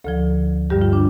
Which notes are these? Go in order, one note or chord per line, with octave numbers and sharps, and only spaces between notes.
D2 D3 F3 A4
G2 D3 G3 G4
F4
D4